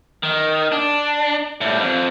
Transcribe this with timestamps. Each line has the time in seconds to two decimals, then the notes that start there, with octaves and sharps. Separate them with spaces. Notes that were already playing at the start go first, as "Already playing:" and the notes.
0.23 D#3
0.72 D4
1.61 A2 G3
1.79 F2